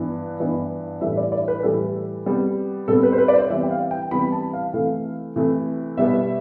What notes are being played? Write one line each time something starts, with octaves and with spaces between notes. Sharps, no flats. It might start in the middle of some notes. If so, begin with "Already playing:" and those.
Already playing: G2 E3 B3
G2 E3 B3
A2 E3 G3 E5
D5
D5
B4
A2 E3 G3 A4
C3 G3 B3
C3 G3 B3 A4
B4
C5
B4
D5
C5
C3 E3 G3 B3 E5
G5
F5
G5
C3 E3 G3 B3 B5
A5
F5
C3 E3 A3 F5
C3 E3 A3
B2 G3 B3 E5